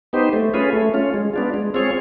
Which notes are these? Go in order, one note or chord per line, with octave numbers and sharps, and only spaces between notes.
B3 D#4 G4 C5
A3
C#4 F4 G#4 B4
A3
C#4 F4
G#3
B3 D4 F4
G#3
C4 F4 G#4 C#5